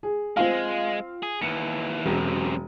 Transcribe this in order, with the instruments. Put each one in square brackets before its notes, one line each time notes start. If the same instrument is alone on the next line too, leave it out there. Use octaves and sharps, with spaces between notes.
[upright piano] G#4
[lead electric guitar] G#3 [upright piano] C4 F4 F5
[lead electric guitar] G#4
[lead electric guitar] D#2 E3 [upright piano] C#7
[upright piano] E1 [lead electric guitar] F#2 C3